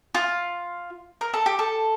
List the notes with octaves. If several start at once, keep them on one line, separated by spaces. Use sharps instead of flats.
F4
A#4
A4
G4
A4